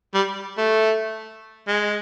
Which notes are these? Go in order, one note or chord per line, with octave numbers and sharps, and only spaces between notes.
G3
A3
G#3